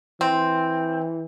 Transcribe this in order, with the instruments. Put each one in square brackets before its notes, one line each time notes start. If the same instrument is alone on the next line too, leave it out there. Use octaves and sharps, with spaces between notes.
[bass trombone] E3 [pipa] C4